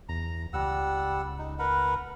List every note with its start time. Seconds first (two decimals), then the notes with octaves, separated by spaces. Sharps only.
0.09 E2 A#5
0.53 C#2 G3 F#5 E6
1.39 D#4
1.59 A#4 B4 F#5